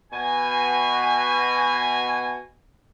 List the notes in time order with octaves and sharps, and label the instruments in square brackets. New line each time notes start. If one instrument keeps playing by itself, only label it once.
[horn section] B2 G#5